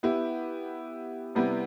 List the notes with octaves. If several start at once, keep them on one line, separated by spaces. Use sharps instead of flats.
B3 E4 G4
C3 G3 B3 E4 G4